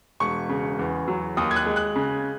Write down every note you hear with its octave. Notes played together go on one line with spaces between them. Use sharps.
E1 C#6
C#3
E2
F#3
D#2 D#6
G#6
F#6
G#3
F#6
C#3